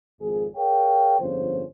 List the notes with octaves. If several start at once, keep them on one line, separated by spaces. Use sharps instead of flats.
G#1 F2 G#4
G#4 A#4 C#5 F5 G5
G1 F2 G#2 F3 C#4 C5